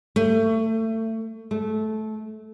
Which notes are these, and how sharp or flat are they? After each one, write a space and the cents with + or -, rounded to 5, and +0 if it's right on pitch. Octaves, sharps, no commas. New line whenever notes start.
A3 +25
A3 -20